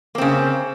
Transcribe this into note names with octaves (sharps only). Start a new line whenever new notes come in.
C#3 A#3 C4